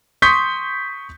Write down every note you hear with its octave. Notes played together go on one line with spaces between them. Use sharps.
C6 C#6 D#6 G6 B6